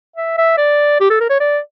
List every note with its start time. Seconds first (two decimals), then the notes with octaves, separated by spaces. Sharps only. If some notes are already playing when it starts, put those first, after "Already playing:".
0.16 E5
0.38 E5
0.57 D5
1.00 G4
1.10 A4
1.20 A#4
1.30 C#5
1.40 D5